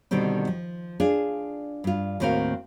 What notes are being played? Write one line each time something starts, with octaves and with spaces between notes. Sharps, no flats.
B2 D3 D#3 G3 C4
F3
D4 F4 G#4
G2 F4
D#2 A2 C4 F#4 A#4 F5